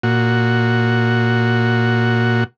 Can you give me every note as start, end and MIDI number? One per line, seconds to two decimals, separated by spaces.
0.03 2.44 46
0.03 2.44 66